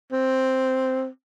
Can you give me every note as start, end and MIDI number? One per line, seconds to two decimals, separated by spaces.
0.12 1.07 60